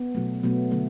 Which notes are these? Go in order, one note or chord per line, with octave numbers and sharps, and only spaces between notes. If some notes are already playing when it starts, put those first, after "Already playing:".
Already playing: B3
B2 F#3 A3
B2 F#3 A3 B3
D3 F#3 A3